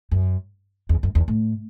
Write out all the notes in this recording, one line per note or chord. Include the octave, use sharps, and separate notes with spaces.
F#2
E2
F#2
E2
A2